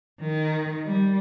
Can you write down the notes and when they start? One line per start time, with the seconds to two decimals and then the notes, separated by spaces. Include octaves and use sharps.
0.20 D#3
0.85 G3